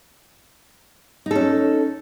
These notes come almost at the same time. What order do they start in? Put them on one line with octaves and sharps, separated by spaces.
D#4 A4 C#4